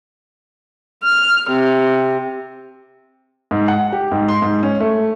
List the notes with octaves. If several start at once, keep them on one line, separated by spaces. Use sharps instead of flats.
F6
C3
G#2
F#5
G4
G#2
C6
G#2
C#4
A3